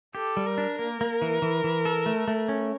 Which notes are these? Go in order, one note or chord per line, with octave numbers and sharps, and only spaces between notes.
G4 A4
G3
A#4
D4
A#3 A#4
A#3
E3
E3
E3
A4
A3
A3
C#4